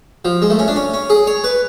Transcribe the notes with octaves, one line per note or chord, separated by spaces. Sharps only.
F3
G#3
A3
C#4
D4
C#4
C#4
G#4
C#5
B4